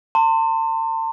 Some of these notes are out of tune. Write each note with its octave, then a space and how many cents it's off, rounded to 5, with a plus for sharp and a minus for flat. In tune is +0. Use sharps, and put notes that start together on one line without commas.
A5 +45 C6 +0